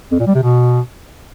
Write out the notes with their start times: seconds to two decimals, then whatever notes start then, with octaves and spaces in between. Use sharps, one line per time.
0.11 F2
0.19 A#2
0.27 G3
0.35 C3
0.43 B2